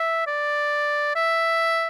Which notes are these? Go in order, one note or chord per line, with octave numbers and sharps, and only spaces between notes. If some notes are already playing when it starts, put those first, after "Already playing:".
Already playing: E5
D5
E5